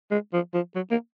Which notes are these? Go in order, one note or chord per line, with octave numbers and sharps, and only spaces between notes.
G#3
F3
F3
F#3
A#3